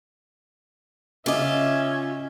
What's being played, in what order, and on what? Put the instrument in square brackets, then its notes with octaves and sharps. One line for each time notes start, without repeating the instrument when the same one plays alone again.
[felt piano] C#3 D6 [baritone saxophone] C#4 [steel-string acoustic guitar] F4 D#5 [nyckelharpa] E5